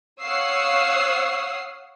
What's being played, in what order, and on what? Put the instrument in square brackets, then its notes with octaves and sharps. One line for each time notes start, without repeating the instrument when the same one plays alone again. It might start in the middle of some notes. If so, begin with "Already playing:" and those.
[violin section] C#5 F5 F#5 D#6 E6 C7